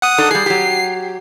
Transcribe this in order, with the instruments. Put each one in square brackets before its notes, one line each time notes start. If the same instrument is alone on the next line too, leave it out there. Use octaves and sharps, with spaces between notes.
[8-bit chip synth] F#5 D#6
[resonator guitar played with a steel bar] D4 D#4 A4
[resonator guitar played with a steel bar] G3 G#4 [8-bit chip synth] C7
[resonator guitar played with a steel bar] F#3 G4